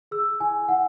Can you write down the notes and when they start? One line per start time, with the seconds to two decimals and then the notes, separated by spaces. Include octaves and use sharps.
0.11 G#4 E6
0.40 E4 G#5
0.68 E4 F#5